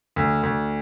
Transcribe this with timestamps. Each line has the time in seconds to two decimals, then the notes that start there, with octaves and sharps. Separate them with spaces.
0.16 D2
0.43 D2